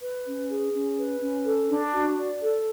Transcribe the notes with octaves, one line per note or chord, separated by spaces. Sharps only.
B4
C#4
G#4
C#4
B4
C#4
A4
D4
F#4
D5
A4